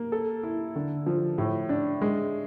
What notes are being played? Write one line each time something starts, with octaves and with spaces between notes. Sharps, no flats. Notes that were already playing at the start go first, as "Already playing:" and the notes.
Already playing: A#3
A4
E4
D3
F3
A2
D4
G#3